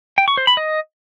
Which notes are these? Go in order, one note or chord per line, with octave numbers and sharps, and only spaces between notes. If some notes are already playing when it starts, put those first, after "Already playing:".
G5
C#6
C5
B5
D#5